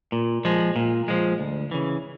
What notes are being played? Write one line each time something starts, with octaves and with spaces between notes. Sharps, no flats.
A#2
F3 G#3
A#2
F3 G#3
D2
C#3 E3